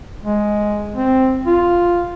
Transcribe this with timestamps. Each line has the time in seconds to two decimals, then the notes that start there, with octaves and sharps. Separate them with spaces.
0.23 G#3
0.95 C4
1.46 F4